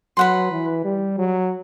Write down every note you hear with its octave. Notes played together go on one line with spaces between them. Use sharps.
F#3 B4 F#5 C6
E3
G3
F#3